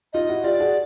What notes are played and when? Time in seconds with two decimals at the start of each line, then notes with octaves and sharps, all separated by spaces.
0.13 D#4 F4 D#5
0.29 E4 F#4
0.44 F4 G4 D5
0.60 F#4 G#4